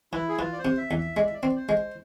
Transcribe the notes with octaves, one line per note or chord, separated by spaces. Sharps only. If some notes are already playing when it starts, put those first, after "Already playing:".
E3 E4
G#4
E3 F4
D5
C5
C3
E5
E2
E5
G#3 D5
E5
D5
C4
C5
G#3